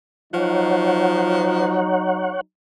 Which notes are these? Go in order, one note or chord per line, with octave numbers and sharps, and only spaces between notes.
F3 F#3 D#4 C#5 F#5